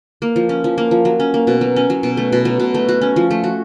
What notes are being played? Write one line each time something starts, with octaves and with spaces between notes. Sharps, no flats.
A#3
F3
C#4
F3
A#3
F3
F#3
C#4
A#3
B2
F#3
C#4
F#3
B2
A3
B2
F#3
B2
A3
F#4
C#4
F3
A3
F#4